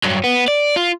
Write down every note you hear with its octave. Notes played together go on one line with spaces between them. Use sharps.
G2 F#3
B3
D5
F4